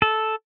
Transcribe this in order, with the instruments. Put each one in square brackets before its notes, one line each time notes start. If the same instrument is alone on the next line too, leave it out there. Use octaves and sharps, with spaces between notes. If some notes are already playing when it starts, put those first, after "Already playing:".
[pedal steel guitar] A4